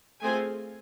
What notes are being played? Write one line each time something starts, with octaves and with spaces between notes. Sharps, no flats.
A3 C4 F4 G#4 G#5